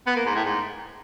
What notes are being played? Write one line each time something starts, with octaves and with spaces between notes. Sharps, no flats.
B3
A#3
G#2
A2
G#2